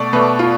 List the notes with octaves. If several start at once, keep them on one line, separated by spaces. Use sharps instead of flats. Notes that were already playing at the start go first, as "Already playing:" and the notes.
Already playing: B2 A3 D5
B2 A3 B4
F4